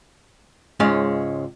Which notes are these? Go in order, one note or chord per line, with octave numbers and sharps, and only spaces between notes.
C#2 G#2 G#3 C#4 F5